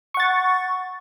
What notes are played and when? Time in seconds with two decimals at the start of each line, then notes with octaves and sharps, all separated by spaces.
0.14 C#6
0.17 F#5
0.20 A6